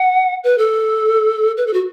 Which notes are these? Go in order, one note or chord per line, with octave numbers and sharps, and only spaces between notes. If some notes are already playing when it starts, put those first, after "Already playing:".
Already playing: F#5
B4
A4
B4
A4
F#4